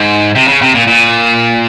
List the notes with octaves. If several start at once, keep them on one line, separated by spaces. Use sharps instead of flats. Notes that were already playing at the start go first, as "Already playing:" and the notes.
Already playing: G#2
C3
C#3
C3
A#2
A#2